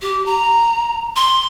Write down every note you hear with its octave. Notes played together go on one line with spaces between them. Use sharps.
G4
A#5
C6